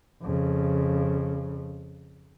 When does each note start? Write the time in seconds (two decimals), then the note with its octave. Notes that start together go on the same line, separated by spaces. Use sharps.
0.22 F2 C#3